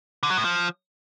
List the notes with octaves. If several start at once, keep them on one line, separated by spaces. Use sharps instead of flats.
D3
F#3
A2
F3